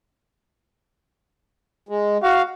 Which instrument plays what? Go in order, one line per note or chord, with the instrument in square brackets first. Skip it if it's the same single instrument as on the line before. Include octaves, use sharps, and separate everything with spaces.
[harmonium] G#3
[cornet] F#4 [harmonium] F5